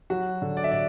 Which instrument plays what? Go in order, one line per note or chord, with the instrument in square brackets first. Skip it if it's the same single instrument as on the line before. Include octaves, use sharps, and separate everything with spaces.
[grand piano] F#3 F#4
D3
D5
E5
D3 D5